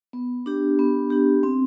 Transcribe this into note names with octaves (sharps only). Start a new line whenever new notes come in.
B3
D4 G4
B3
D4 G4
C4